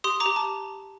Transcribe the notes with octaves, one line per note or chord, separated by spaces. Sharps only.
G4 C6 D#6
A#5 D6
G4
A5